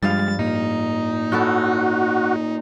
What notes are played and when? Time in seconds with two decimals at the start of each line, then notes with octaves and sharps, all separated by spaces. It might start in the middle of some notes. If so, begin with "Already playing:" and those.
0.03 G2 F3 G3 G#3 F5 A6
0.39 A2 A#3 D#4
1.32 C#4 E4 F#4 A4